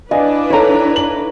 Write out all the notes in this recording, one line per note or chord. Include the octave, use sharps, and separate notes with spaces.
E3 D4 B4 D5 D#5 F5 G#5
D#4 A4 C#5 A#5
F#7